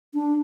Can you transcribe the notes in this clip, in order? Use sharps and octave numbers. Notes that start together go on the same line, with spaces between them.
D4